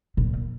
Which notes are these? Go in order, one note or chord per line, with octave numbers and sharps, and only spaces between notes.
A#2